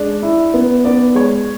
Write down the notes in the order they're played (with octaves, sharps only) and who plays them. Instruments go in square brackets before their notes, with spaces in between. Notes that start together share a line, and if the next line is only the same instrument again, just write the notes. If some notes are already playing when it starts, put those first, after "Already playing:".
Already playing: [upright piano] G#3 [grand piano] D4
[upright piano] E4
B3
[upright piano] B3 [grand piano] D5
[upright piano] G#3 [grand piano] C#5